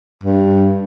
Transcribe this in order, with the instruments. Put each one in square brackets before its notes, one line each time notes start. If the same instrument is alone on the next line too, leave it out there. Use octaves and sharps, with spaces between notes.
[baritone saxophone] G2